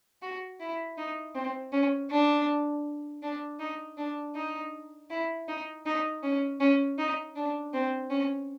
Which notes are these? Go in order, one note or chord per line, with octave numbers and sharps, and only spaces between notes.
F#4
E4
D#4
C4
C#4
D4
D4
D#4
D4
D#4
E4
D#4
D#4
C#4
C#4
D#4
D4
C4
C#4